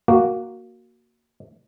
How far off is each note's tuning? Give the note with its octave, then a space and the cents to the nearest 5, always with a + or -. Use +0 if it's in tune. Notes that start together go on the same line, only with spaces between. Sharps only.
A#3 +0 F#4 +0